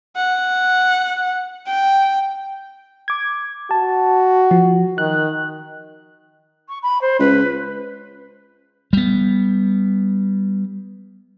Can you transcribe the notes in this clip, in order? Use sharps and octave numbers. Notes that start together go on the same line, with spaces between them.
F#5
G5
D6 G#6
F#4 A5
F3
D#3 F#6
C#6
B5
C5
C#2 B4
G3 B3